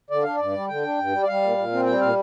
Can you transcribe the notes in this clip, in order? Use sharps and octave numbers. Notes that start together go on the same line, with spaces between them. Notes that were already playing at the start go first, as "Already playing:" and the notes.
D3 D5
D4 F5
G2 D5
G3
D3 G5
D4
G2
G3
D5
G3 F5
A#2
A#2
C4
G3 G5
A#2 F5